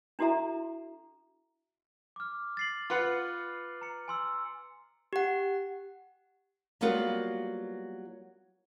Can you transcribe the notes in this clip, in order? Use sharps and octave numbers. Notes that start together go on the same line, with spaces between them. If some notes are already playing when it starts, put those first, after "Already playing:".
D4 E4 F#4 A4 E5 A#5
D6 F6
A6 C7 F#7
F4 B4 F#5 F6 C#7
A#5 C#7
G#5 C6 E6
G4 F#5
F#3 G3 A#3 B3 F4 F#4